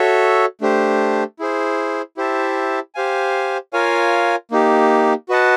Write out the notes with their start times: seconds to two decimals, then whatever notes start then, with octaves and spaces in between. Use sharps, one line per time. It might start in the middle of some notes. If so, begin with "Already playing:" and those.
Already playing: F#4 A4 C#5 E5
0.61 A3 D4 G4 C5
1.39 E4 G#4 C5
2.17 E4 G4 C5 E5 A5
2.95 G4 C5 F5 G#5
3.73 F4 A#4 C#5 F5 G#5
4.51 A#3 D#4 G4
5.29 F#4 B4 D#5 F#5 A5